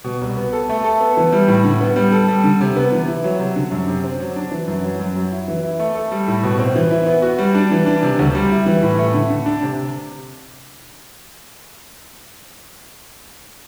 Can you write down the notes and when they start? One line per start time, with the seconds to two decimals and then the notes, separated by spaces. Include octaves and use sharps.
0.04 B2
0.21 C2
0.37 B3
0.53 A4
0.69 A3
0.84 A4
1.01 B3
1.17 E3
1.32 G3
1.48 A2
1.64 D3
1.81 B3
1.96 G3
2.12 A4
2.28 G3
2.44 D3
2.61 C3
2.76 B3
2.92 E3
3.07 E4
3.24 F#3
3.39 C3
3.56 D3
3.72 F#2
3.88 C3
4.04 C4
4.20 F#3
4.36 D4
4.51 E3
4.68 F#2
4.84 F#3
5.00 F#2
5.16 F#3
5.32 E4
5.48 E3
5.63 E4
5.79 A3
5.95 A4
6.12 G3
6.28 A2
6.43 B2
6.59 C4
6.76 E3
6.91 E4
7.07 B3
7.22 F#4
7.39 G3
7.55 D4
7.71 E3
7.86 D4
8.03 C3
8.19 D2
8.35 G3
8.51 E4
8.66 E3
8.83 A2
8.99 A3
9.14 D3
9.30 D3
9.46 D4
9.62 C3